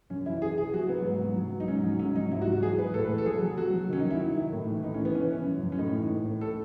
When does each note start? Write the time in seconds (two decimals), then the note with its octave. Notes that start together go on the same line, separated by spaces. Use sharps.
0.10 F#2 C#4
0.26 E3 E4
0.42 E3 G#4
0.58 E3 G#4
0.73 F#3 F#4
0.89 F#3 B3
1.05 G#2
1.21 F#3
1.37 F#3
1.52 F#3
1.60 D#4
1.68 G#2 C#4
1.84 F#3
1.99 G#2 C#4
2.16 F#3 D#4
2.32 G#2 E4
2.42 F#4
2.47 F#3
2.52 F#4
2.63 E3 G#4
2.79 E3 B4
2.94 A2 A4
3.05 B4
3.10 E3
3.18 A4
3.26 F#3 G#4
3.42 F#3
3.57 F#3 F#4
3.73 F#3
3.89 D#3 C#4
4.00 D#4
4.05 F#3
4.11 E4
4.21 D#3
4.37 D#3
4.52 A2
4.68 E3
4.84 A2 D#4
4.94 C#4
5.00 E3
5.05 B3
5.15 E3 C#4
5.31 E3
5.46 F#2
5.63 F#2
5.72 C#4
5.78 A2 D#4
5.94 E3
6.10 A2
6.25 A2
6.41 A4